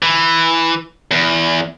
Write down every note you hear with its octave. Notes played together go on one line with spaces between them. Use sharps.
E3
E2